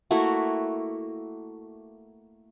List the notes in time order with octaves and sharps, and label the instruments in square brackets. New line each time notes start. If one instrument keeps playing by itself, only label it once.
[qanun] A3 A#3 E4 F#4